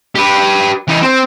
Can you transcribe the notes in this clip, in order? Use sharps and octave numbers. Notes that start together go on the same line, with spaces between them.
G4 B4
E3 D#4
C4